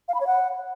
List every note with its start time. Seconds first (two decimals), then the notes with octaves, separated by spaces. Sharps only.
0.08 F5
0.14 B5
0.21 C#5
0.27 F#5